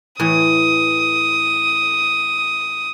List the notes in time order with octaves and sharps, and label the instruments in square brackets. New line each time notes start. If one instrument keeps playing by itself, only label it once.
[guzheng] A2 E3 C#5 [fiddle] D#6